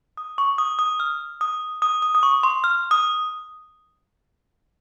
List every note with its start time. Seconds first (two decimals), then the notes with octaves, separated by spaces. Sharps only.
0.17 D#6
0.38 C#6
0.58 D#6
0.79 D#6
1.00 F6
1.41 D#6
1.82 D#6
2.02 D#6
2.15 D#6
2.23 C#6
2.43 C6
2.64 F6
2.91 D#6